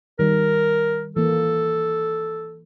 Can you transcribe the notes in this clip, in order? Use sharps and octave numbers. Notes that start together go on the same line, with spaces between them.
D#3 G3 A#4
E3 A#3 A4